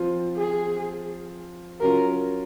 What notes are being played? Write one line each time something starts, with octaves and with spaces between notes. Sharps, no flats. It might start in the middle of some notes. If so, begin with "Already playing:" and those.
Already playing: F3 C4 F4
G#4
F#3 C#4 F4 A#4